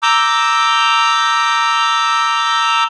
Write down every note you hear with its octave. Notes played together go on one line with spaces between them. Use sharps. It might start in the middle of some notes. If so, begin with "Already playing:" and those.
A#5 D6 E6 G6